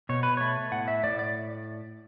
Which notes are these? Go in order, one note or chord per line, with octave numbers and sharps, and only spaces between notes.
B2 C#5
B4
A3 C#5
A2 F#5
E5
A2 D5
D5